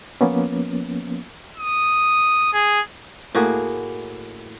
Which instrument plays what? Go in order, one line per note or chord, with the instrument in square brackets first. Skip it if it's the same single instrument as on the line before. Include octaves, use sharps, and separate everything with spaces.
[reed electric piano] F3 A#3 B3 C#4
[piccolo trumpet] D#6
G#4
[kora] A2 A#3 F#4 G#4